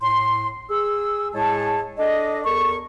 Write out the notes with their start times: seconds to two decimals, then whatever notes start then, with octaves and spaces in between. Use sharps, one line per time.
0.01 A2 C6
0.70 G#4 E6
1.33 A2 G#3 G#4 C#5 A5
1.98 D4 A4 D5 D#5
2.44 E2 A4 A#4 C#6